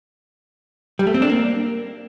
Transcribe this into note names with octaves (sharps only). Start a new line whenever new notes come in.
G3
A3
C4
D4
A#3